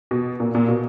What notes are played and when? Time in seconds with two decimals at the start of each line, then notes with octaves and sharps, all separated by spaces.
0.11 B2
0.40 A#2
0.55 A#2
0.68 B2